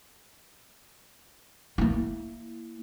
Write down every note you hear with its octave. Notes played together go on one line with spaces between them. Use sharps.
A#3 E4